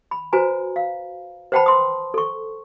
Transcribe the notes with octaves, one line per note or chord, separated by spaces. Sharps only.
B5
F#4 B4 C5 G#5 A#5
F5
B4 C5 F#5 G5 A5 B5
C6 D#6
A4 C#6